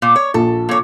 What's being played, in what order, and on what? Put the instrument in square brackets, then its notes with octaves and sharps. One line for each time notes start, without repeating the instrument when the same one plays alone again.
[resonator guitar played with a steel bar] A#2
C#5
[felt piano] A#1 [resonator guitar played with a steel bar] A4
[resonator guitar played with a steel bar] A#2 C#5